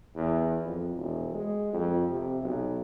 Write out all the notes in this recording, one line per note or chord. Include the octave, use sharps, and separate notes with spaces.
E2
F2
E1
G#3
F2
C3
B1